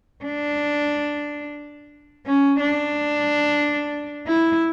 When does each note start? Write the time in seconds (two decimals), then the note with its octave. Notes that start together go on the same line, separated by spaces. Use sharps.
0.25 D4
2.27 C#4
2.59 D4
4.27 E4